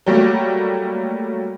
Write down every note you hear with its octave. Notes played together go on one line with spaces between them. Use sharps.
F#3 G3 A3 A#3